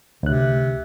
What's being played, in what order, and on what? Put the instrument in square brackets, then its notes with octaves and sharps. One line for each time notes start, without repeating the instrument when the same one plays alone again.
[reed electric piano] D2 F#6 [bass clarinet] C3